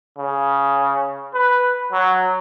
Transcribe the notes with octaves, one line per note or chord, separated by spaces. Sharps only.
C#3
B4
F#3